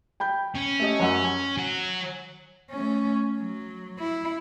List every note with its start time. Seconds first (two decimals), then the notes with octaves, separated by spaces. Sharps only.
0.20 G5 B5 G6
0.55 C#4
0.80 A3 G4 D#5
1.00 F#2 F#5 E6
1.24 G#5
1.57 F#3 F#4
2.71 A3 C#4
3.37 F#3
3.99 E4